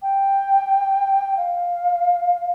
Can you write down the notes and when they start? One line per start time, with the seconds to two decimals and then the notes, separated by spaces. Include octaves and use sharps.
0.02 G5
1.37 F5